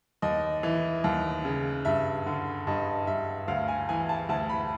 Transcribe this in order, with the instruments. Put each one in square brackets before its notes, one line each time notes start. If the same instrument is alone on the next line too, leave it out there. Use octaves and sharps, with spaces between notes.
[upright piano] D#2 D#5
E3
D#2
C#3
G2 E5
D3
G2 D#5
G2 E5
D2 F5
G#5
E3 G#5
A5
D2 A5
B5